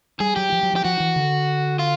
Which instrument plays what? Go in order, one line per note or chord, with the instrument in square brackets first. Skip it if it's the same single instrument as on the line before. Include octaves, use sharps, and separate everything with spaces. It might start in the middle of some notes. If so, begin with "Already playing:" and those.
[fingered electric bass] G3 [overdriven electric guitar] G#4
[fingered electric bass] F#3 [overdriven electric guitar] G4
[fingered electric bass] F3
F#3
F3
[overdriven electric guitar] G4
[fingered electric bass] F3 [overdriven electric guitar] F#4
[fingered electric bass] E3
D3
[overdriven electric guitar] F4